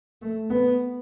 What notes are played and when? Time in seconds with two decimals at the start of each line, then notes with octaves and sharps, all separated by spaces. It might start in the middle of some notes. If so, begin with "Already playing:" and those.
0.22 A3
0.50 B3